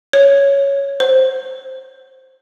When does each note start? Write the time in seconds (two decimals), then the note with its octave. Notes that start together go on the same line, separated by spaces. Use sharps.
0.13 C#5
1.00 C5